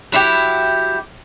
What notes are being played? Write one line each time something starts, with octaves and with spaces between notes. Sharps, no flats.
F#3 E4 F#4 G4